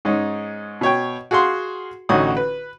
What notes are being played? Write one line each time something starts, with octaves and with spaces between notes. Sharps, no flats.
G#2 C#4 D#4
B2 C#5 G5
F#4 G#4 F5 F#5 C6
A1 D3 C#4 D#4 F#4 D#6
B4